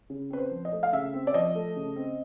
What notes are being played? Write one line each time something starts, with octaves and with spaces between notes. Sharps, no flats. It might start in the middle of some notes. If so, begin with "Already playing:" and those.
C#3
C4 B4
C5
F3
D#5
A3
F5
C#3 E5
C4
D5
F3 D#5
A3
C#3
C4